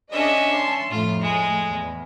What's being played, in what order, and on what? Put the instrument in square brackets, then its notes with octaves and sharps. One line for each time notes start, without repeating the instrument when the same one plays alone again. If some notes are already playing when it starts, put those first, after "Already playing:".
[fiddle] C#4 E5 [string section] D4 G#4 D#5
[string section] A5 C6
[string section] F2 A2 [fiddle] F4
[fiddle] G#3
[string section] E2